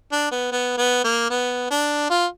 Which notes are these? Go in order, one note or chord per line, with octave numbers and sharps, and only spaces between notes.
D4
B3
B3
B3
A#3
B3
D4
F4